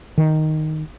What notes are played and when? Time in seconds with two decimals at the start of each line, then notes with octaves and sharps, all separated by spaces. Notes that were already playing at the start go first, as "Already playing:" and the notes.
0.18 D#3